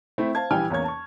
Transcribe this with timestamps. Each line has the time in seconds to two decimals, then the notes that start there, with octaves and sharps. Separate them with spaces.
0.18 A3 C4 E4
0.35 C5 F5 A5 G#6
0.51 A#1 E3 G3 G5 G#5 F6
0.70 E2 A#3 C#4 C#5 G#6
0.84 A5 C#6